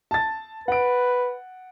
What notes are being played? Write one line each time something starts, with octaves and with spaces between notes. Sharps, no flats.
A5 A6
B4 F#5 D7